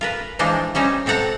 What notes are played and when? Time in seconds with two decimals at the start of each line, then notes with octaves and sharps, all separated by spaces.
0.01 F4 A#4 B4
0.39 E3 F3 G#3 D4 D#4
0.75 G3 C#4 D#4 C5
1.06 B2 C4 A4 F#5 A#5